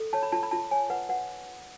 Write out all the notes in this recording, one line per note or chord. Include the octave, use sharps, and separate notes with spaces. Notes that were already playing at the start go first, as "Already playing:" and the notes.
Already playing: A4
C#5 A5
B5
F4 A5
B5
F4 A5
C#5 G#5
B4 F#5
B4 F#5